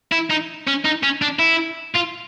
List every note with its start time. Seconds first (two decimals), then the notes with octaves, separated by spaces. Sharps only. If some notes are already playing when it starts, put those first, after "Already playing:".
0.12 E4
0.31 D#4
0.68 C#4
0.85 D#4
1.03 C#4
1.22 D4
1.39 E4
1.95 F4